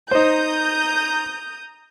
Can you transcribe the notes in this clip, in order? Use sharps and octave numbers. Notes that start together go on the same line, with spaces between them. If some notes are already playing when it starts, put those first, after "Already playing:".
D#4 C5 A#5 D#6 G6